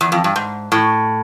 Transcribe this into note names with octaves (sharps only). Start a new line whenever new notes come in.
E2
F2
G2
G#2
A2